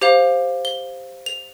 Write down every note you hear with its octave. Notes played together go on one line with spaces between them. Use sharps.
G4 C5 F5 F7
G7
F7